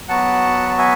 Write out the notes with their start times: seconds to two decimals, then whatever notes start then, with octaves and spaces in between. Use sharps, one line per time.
0.09 F#3 B3 F#4 F#5 A5
0.69 A5
0.78 E5 G#5